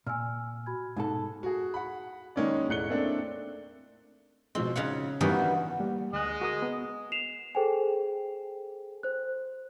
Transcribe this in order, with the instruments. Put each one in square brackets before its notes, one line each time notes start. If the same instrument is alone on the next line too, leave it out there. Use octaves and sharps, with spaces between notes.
[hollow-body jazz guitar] A#2 [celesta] G#5 E6 F6
[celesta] F#4 B5 G#6
[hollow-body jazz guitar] G#2 B2 A4 [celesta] D#4
[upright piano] F#4 G#4
F#5 B5
D#3 G#3 A#3 C#4 D#4 D5
E1 A2 F#6 C#7 G7
A3 A#3 C4 D4 A4
[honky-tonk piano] B2 F3 G#3 [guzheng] C4
[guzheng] C#3 F5 F#5 [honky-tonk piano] D#4 F4
[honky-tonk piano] G2 G3 [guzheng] D#3 E3 D#4 [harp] B3 F#4
[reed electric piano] G3 A#3
[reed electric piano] D2 F#6 [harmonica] G#3 D#5
[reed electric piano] F#4 A#4 D#6
B3
[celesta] C7 E7 F7
G#4 A4 C5 G5 G#5
C5 F#6